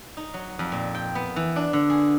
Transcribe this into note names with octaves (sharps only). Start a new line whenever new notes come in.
D#4
F#3
F2
A#2
G5
B3
E3
D4
D3
G#4